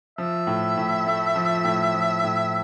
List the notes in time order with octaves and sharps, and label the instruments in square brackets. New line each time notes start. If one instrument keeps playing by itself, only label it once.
[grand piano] F3 [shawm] E5
[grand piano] A2
A2
A3
F3
A2
F3
A2